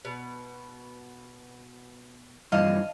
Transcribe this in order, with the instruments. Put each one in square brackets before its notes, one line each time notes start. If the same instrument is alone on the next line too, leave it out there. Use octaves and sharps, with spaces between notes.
[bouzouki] B2
[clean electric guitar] G2 E3 F3 [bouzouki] D#5 F5 A5